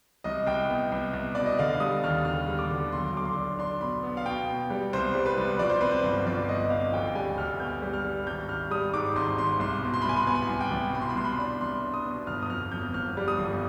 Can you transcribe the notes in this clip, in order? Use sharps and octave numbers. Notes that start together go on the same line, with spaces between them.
C2 D#5
C2 G5
B3
C2
C2
B2 D5
D#5
D3 F5
G3 D#6
D#2 F6
D3 F6
G3
D6
D3
B1 C6
B1 D6
C6
D4
D4 C6
B2 B5
B3
F5
B2 G5
B2
G3
C2 C5
G3
B4
C2
F3 D5
C5
C4 B4
C5
G1
F3 D5
G1 D#5
C4 F5
D2 G5
G3 G#5
D2 F6
B3 G6
G3
F6
G3
G#1 G6
G#1 F6
G3 D#6
G#2 D6
G#1 C6
G#1 C6
C2 C6
B2
C6
B5
C2 G#5
B5
B3 G#5
B5
G#5
C2
G5
C2
B2 B5
C6
B5
C2 C6
B5
C6
D4 B5
C2 C6
D4
D#6
B2
G1 F6
D#6
F2 F6
F2 G6
G1 F6
G3
D#6
G1